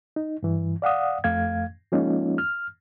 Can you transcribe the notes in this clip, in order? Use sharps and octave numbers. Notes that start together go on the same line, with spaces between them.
D#4
G2 E3
D5 F5 F#5 D#6
F2 A3 F5 G#6
F3 G#3 A#3 C#4 D#4 F4
F6